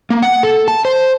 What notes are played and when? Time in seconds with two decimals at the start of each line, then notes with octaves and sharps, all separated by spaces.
0.10 A#3
0.22 F#5
0.43 A4
0.68 A5
0.85 C5